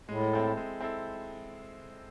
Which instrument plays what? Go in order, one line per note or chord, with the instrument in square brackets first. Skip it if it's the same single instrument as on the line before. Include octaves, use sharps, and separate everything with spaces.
[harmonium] A2 [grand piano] G#3
[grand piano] C4 E4 A4
G#3
C4 E4 A4